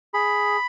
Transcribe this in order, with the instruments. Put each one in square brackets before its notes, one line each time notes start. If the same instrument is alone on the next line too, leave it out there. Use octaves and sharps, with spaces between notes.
[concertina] G#4 B5